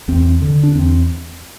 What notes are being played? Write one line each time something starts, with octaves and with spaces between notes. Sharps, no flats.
E2 C4
D3
D4
E2 C4